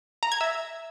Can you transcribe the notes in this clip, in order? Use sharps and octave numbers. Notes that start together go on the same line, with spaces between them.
A#5
G#6
E5